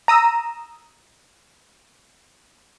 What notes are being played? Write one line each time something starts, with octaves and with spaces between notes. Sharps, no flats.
A#5 D#6 E6